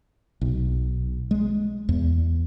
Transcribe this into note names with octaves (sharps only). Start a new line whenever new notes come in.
B1
G#3
E2